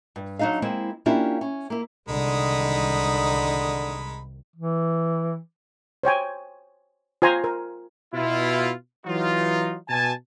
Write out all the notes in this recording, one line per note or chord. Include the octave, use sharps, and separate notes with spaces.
G2
F#3 D4 D#4 D#5 F5
G#3 A#3 C4 E4
A#3 C#4 D4 E4 F4 G4
C#4
A#3 E4
C2 D3 D#3 G#3 D#4 B5
E3
C5 C#5 G5 G#5
F4 C5 G#5 A#5 C6
A#4
B2 E4 F4
E3 F#3 D#4 F4
B2 G#5 A5